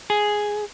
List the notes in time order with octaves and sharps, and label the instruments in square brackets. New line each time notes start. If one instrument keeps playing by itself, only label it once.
[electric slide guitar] G#4